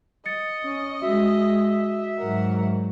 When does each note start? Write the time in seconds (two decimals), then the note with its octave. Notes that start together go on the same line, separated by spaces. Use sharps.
0.26 D#5 A6 C#7
0.63 C#4
1.02 G#3 F#4 E5
2.18 G#2 F#3 A#4 F#5